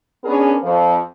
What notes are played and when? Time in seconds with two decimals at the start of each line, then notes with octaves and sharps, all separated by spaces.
0.25 B3 C#4 D4 G#4 A#4
0.62 F2 F3